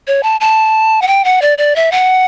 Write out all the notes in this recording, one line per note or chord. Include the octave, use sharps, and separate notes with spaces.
C#5
A5
A5
F#5
G5
F#5
D5
D5
E5
F#5